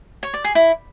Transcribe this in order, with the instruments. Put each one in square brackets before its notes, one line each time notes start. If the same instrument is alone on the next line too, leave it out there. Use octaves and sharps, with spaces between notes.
[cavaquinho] C#5
D5
G#4
E4